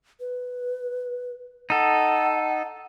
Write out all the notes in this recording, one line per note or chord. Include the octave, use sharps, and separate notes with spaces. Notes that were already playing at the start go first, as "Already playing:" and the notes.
B4
D#4 A4 F#5